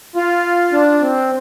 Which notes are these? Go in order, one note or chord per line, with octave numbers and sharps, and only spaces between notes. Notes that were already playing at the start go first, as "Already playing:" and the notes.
F4
D4
C4